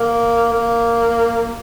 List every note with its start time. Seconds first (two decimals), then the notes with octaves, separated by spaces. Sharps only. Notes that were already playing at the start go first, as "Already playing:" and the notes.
Already playing: A#3
0.53 A#3